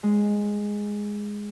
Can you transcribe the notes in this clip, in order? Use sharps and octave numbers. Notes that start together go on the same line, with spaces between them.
G#3